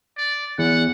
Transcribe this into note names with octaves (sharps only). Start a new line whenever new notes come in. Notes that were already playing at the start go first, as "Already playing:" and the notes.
D5
E2 F#5